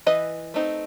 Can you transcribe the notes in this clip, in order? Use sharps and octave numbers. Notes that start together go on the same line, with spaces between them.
E3 B4 D#5
A3 C4 D#4